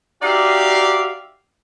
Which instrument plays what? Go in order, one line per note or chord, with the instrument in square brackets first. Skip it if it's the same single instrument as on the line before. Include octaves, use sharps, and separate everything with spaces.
[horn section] D#4 F#4 G4 D5 E5 F5